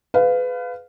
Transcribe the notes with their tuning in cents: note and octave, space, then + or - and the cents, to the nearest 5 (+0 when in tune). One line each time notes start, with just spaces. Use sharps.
G#4 +35 B4 +25 F5 +0